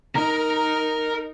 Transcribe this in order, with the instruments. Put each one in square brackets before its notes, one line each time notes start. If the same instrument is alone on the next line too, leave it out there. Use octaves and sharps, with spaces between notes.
[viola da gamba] D#4 [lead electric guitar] A#4 A#5